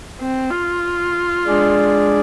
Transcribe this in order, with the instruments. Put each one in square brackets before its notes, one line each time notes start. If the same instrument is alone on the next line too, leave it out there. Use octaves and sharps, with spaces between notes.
[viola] C4
F4
[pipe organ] G#3 D4 G#4 D5